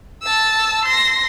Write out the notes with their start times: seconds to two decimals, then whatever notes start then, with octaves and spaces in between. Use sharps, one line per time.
0.23 A5 E6
0.85 C6 A#6